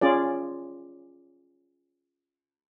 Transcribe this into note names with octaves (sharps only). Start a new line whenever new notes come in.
C#4 F4 G#4 D5